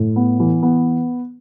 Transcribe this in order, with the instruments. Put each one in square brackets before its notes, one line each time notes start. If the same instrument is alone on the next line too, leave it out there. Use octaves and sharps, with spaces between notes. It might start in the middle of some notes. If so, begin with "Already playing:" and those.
Already playing: [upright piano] A2
B3
E3
B3